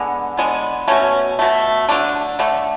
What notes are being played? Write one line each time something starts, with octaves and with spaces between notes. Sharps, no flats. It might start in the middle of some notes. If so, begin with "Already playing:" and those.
Already playing: D3 G#3 B3
D3 G#3 B3
B2 A3 C#4
B2 A3
D3 A3 D4
D3 A3